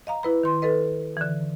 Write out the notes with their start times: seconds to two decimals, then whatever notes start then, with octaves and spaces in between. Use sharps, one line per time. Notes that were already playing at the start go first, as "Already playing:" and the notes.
0.07 D#5 F5 A#5
0.23 E4 B4 B5
0.43 D#3 C6
0.62 A4 B4 D#5
1.17 D3 E3